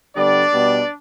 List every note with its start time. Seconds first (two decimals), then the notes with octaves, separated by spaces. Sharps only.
0.16 D3 G3 B3 D4 D5
0.53 B2 G3 B3